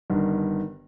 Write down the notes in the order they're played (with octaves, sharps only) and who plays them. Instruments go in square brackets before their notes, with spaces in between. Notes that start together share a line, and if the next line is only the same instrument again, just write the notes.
[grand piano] G1 G2 D#3